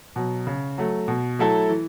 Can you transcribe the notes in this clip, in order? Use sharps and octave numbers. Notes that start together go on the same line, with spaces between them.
B2 F#3
C#3
F#3 A3
B2
F#3 A3 E4 A4
E3